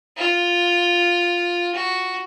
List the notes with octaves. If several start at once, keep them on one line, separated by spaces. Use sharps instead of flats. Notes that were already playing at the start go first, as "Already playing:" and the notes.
F4
F#4